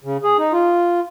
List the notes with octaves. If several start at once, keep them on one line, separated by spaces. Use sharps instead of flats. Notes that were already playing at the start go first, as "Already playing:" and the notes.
C#3
G#4
D#4
F4